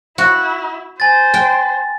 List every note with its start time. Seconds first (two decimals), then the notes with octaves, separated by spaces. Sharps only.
0.18 E4 F#4
1.00 C5 G#5 A6
1.34 G5